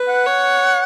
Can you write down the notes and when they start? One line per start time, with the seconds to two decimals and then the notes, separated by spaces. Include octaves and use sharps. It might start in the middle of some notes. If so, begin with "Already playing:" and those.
Already playing: B4
0.09 F#5
0.26 C#5